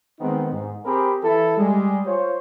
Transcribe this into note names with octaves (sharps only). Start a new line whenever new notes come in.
D#3 G#3 B3 C4 D#4
G#2
C4 G4 G#4 A#4 B5
E3 E4 A4
G3 G#3
F4 C5 C#5